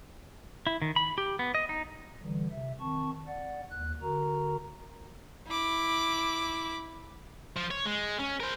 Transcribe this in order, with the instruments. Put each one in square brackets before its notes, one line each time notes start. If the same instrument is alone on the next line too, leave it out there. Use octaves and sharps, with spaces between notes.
[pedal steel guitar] E4
D#3
B5
G4
B3
D#5
D#4
[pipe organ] D3 E3 G3
C3 E5
D#3 C4 A5 C#6
D5 F#5
D#2 F#6
D3 F#4 A#4 A#5
[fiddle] E4 D6
[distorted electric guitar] F3
C#5
G#3
C#4
A#4 C5